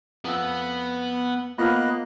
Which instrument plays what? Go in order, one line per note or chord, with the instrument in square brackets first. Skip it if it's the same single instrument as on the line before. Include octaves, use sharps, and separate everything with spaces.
[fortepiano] F2 E6 [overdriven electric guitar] B3
[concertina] A#3 D#5 F#6 [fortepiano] B3 F6 [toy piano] F4 C5